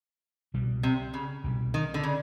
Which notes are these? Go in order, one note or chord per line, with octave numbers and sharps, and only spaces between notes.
C2 B2 G3
C3
C#3
C2 B2 G3
D#3
D3
C#3